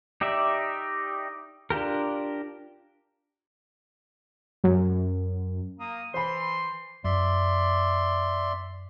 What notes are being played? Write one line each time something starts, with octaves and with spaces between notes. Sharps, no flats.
D#4 G4 D5 E5
D4 F4 G4 A#4
F#2
A#3 D#6
E3 C5 B5 C6
F#2 D5 E5 C6